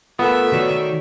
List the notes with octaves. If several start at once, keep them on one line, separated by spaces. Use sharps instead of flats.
A3 B3 F4 A4 A#4 E5
D#3 F#4 C#5 D5